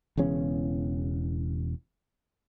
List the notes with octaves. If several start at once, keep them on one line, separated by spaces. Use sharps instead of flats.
E1 E2 C#3 C#4